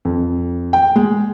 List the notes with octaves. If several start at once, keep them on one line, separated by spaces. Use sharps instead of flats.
F2
G5
G#3